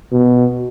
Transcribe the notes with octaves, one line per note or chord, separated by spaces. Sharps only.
B2